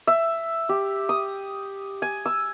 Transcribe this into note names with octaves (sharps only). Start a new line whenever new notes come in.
E5
G4
D#6
G#5
E6